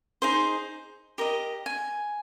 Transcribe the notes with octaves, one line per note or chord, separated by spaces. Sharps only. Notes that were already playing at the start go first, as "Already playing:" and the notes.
D#4 G#4 C5
G4 A#4 D#5
G#5